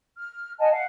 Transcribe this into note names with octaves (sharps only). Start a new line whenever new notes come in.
F6
D#5 F#5 G#5 A5
F5 F#5